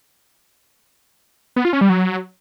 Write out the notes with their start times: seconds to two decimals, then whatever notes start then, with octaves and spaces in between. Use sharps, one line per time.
1.56 B3
1.65 F4
1.73 C#4
1.81 G3
1.89 F#3